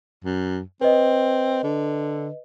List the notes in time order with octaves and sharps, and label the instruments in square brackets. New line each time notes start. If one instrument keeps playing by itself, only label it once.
[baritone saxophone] F#2
[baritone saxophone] C4 [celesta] B4 D#5
[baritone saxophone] D3